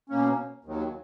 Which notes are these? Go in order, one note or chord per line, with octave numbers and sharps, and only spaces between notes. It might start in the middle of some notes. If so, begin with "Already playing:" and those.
B2 A#3 C#4
D#2 D#3 F#3